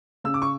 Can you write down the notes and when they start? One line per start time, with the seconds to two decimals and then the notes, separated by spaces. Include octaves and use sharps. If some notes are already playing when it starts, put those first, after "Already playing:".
0.24 C#3 E6
0.34 D6
0.42 C#6